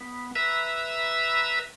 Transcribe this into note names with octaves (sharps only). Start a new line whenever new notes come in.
B3
B4 E5 A#5 E6